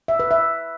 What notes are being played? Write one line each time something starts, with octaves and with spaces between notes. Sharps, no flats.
E5
B4
E5